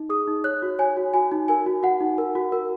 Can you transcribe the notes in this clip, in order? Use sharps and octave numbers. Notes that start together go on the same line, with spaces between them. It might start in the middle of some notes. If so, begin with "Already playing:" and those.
Already playing: D#4
G#4 D#6
D#4
C#5 F#6
F#4
C#5 G#5
F#4
F#4 G#5
D#4
A#4 G#5
F#4
F#4 F#5
D#4
A#4
F#4
A#4